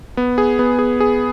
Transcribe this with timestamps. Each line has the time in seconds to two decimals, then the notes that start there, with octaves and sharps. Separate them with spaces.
0.17 B3
0.38 G#4
0.59 B3
0.79 G#4
1.00 G#4